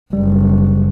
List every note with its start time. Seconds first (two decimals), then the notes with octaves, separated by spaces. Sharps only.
0.13 F#1 G3